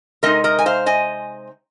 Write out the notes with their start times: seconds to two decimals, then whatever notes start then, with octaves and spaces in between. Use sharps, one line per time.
0.23 C3 G#3 C4 D#4 A#4 D#5
0.44 A#4 D#5
0.59 G#5
0.66 C5 F5
0.86 D#5 G#5